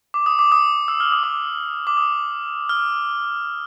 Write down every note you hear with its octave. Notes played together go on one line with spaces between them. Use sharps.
D6
D#6
D6
D#6
E6
F6
D#6
D6
D6
D#6
F6